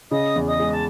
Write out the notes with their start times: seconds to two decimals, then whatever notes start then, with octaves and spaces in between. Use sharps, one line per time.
0.11 C#3 D#5 D#6
0.36 E2
0.47 D#5 D#6
0.60 G#3
0.71 A5